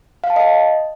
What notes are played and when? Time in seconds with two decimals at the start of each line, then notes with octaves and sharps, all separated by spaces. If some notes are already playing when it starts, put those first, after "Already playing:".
0.24 F5
0.30 A5
0.36 D#5